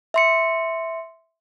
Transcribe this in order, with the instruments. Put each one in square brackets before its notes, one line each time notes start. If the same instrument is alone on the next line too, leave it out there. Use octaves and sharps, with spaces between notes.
[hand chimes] E5 C6 C#7